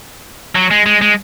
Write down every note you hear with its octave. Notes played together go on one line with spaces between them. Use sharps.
F#3
G#3
G#3
G#3